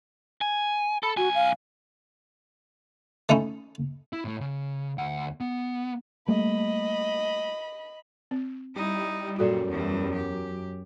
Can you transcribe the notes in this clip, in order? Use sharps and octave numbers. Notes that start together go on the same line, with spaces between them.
G#5
A4 B5
B1 F#4 G#5
F5
A3 C#4 D#4 E4
E4
A2 A3
C#3
D2 F#5
B3
G3 A3 A#3 D#5 B5
C4
G3 D#4 E4
F#2 A#2 F#4 A4 D5
E2 E3
G4